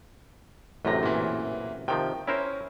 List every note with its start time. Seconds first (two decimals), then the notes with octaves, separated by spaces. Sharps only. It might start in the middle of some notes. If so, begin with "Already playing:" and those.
0.85 A1 F#2 C3 A3 A#6
1.03 A#2 E3
1.88 C3 D#3 F3 G5
2.27 C#4 E4 A#4 C5